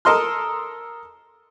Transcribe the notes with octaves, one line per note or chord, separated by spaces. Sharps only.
A4 A#4 D#5 C6 F6